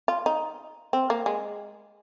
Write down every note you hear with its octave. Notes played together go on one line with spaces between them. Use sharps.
F4
D#4
C4
A#3
G#3